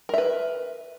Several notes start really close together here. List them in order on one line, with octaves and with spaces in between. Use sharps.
A#4 E5 B4